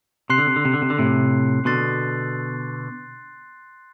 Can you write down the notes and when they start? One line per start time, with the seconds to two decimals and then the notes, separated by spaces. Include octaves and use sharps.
0.30 C3 C6 F#6 C7
0.38 D3
0.47 C3
0.56 D3
0.65 C3
0.73 D3
0.82 C3
0.90 D3
0.99 A2 C3
1.65 B2 D3 C6 F#6 A6 C7